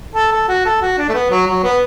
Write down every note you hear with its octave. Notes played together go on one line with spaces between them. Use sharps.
A4
A4
F#4
A4
F#4
D4
A3
B3
F#3
F#3
B3